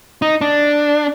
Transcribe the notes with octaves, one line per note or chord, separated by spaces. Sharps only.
D#4
D4